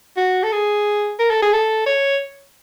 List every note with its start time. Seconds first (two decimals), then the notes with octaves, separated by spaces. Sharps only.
0.17 F#4
0.43 A4
0.52 G#4
1.19 A#4
1.31 A4
1.42 G#4
1.53 A4
1.87 C#5